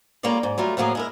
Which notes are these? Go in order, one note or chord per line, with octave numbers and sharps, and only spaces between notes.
G3 G#3 A#3 F4 C#5 D5
G#2
F#3 G3 A3 F4
A2 F3 F#3 A#3 G#4
G#3 E4 A#4